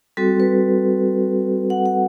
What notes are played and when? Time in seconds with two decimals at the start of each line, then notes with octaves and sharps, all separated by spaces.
0.17 G3 C4 F#4 A4
0.40 B4
1.70 F#5
1.86 F#5